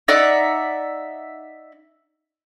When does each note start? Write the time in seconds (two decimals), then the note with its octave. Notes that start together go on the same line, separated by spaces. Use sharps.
0.08 D#4 D5 E5 F#5